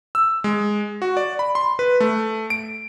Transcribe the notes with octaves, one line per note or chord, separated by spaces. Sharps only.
E6
G#3
F#4
D5
B5
C6
B4
A3
D7